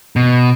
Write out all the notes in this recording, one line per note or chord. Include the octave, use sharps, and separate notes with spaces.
B2